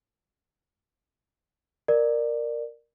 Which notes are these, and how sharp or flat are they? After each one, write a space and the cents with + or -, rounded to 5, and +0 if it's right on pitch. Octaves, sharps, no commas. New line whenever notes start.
A#4 +0 D5 +20